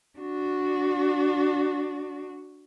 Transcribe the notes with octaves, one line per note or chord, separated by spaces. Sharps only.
D4 F#4